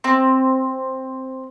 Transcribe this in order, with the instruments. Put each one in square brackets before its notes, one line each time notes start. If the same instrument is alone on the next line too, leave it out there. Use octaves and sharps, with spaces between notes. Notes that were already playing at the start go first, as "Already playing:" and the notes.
[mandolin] C4